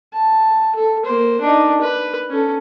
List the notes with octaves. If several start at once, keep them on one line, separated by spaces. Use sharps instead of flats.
A5
A4
A#3 C5
D4 D#4
B4
C#4 A4